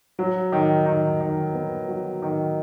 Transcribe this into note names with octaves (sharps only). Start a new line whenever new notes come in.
F#3
D#3
D#3
D#3
B3
F#3
D#3